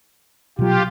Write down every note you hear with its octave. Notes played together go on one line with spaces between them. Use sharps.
B2 F#3 F4 G4